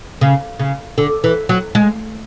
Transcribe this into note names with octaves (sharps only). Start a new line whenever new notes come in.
C#3
C#3
D3
E3
F#3
G#3